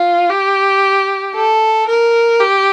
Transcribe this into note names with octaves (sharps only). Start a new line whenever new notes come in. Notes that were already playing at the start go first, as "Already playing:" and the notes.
Already playing: F4
G4
A4
A#4
G4